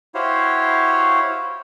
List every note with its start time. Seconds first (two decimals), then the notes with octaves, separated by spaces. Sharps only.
0.15 E4 F#4 G4 C5 C#5 F5